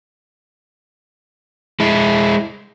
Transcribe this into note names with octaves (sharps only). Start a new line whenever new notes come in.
G#3 E4